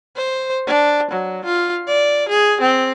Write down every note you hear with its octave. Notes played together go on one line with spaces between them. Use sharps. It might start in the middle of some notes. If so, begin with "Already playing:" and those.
C5
D4
F#3
F4
D5
G#4
C4